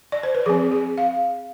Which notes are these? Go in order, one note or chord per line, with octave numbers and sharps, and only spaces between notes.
D5
C5
B4
F3 C4 G#4
G#4
F5